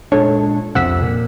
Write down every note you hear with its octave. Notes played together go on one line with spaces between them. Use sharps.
A#2 G#3 D4 A4 C#5
C2 F2 C3 F#5 E6 B6
A#2